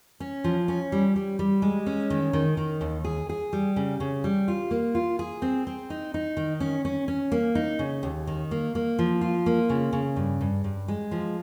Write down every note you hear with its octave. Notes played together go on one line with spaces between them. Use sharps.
C#4
F3
C#4
G3
G3
G3
G#3
C#4
D#3
D#3
D#3
D#2
G#4
G#4
G3
C#3
C#3
G3
F4
A#3
F4
G#4
C4
C4
D#4
D#4
D#3
C#4
C#4
C#4
A#3
D#4
C#3
D#2
D#3
A#3
A#3
F3
F4
A#3
C#3
C#3
G2
G2
G2
G#3
F3